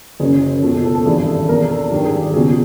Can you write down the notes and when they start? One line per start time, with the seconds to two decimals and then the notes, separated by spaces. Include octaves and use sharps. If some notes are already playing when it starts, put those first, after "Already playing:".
0.20 F#1 F#2 C#3 G#4
0.62 C#2 B2 A4
0.74 A4
0.85 A4
0.95 A4
1.06 G#1 G2 E3 G#4
1.27 A4
1.48 E2 B2 A#4
1.70 A4
1.91 G#1 G2 D#3 G4
2.05 G#4
2.20 G4
2.34 C#2 B2 G#4